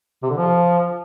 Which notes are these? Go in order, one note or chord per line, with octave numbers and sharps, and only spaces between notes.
C3
D3
F3